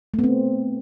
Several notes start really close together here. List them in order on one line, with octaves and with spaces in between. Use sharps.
A3 B3 C4